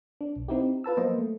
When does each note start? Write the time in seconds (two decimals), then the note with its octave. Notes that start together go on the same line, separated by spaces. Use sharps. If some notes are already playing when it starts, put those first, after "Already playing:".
0.21 D4
0.36 B1
0.48 C4 D#4 E4 G4
0.84 F4 B4 A5 E6
0.97 F3 F#3 A#3 B3 C5 D#5
1.18 A3